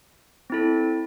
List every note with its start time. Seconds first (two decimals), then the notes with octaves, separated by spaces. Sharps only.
0.50 C4 E4 A4